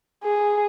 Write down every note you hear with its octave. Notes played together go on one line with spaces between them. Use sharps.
G#4